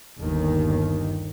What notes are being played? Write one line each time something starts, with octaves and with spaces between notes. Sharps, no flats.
G1 D#2 D#3